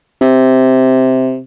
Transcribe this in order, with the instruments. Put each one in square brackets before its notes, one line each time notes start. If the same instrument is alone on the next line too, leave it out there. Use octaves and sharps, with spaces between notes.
[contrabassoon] C3